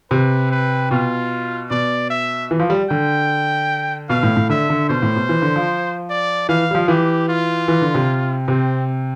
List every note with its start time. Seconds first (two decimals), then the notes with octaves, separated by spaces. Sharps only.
0.11 C3 B4
0.51 B4
0.91 B2 F4
1.70 B2 D5
2.10 E5
2.51 E3
2.60 F3
2.70 G3
2.90 D3 G5
4.10 B2 F5
4.23 A2
4.36 A2
4.49 D3 E5
4.70 D3
4.89 B2 C5
5.02 A2
5.16 B2
5.29 E3
5.42 D3
5.56 F3
6.09 D5
6.49 E3 F5
6.71 G3
6.75 F3
6.88 E3 G4
7.28 F4
7.68 E3
7.82 D3
7.95 C3
8.48 C3 C4